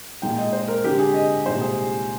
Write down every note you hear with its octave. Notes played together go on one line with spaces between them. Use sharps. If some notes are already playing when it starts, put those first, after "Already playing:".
A#2 G#3 D#4 G5
D#5
C5
A#4
D3 G#3 C4 G4
G#4
D#5
C2 A#2 G#3 D#4 C5
G#4